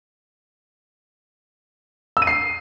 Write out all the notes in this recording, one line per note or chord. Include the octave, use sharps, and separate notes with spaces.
E6
D#7
C7